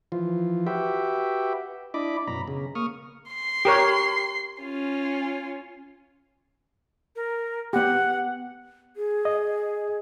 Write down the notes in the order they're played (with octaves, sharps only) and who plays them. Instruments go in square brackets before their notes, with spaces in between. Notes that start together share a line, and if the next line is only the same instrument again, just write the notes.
[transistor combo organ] E3 F3 F4
F#4 G4 B4 E5 G5
D4 E4 D#5 B5 D6
F#2 B2 A#5 B5
C#3
A#3 C#6 D#6 F6
[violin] C6 C7
[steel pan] G4 A#4 C#5
[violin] C#4 F4
[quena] A#4
[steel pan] B3 G4 [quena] F#5
[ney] G#4
[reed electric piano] D#5